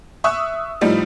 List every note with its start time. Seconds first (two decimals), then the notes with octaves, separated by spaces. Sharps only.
0.24 E5 C#6 D#6 E6 F#6
0.81 A2 F3 G3 D#4